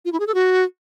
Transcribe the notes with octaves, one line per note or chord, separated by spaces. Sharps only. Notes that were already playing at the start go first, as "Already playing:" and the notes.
F4
E4
G#4
A4
F#4